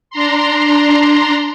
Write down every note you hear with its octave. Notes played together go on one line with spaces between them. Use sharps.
D4 A#5 C6